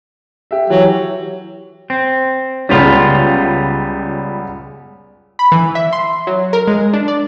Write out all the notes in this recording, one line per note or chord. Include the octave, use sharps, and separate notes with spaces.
G4 E5
E3 F#3 G4
C4
C#2 G3 B3 C#4 F4
B5
E3
E5
C6
F#3
A#4
G#3
D4
D5